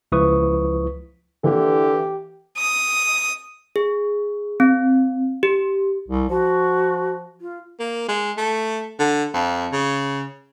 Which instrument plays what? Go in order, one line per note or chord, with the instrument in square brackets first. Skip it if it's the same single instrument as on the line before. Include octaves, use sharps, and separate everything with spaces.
[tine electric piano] C#2 F3 E4 B4 C#6 D#6
[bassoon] D3 [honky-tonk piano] E3 A#3 [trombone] G4
[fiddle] D#6
[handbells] G#4
C4
G4
[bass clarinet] C2
[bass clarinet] F3 [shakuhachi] F#4
[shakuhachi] F4
[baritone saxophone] A#3
G#3
A3
D3
F2
C#3